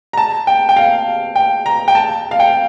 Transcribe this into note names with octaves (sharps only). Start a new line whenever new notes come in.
A#5
A5
G5
G5
F5
G5
A#5
G5
A5
F5
G5